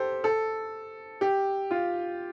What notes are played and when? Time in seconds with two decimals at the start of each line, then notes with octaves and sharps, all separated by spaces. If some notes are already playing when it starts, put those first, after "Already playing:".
Already playing: G4 A4 C5
0.24 A4
1.21 G4
1.71 F4